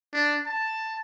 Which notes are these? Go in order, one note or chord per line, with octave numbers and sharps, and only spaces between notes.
D4
A5